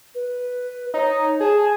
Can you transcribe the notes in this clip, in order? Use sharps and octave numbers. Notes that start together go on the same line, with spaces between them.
B4
D#4 C#5
G#4 A5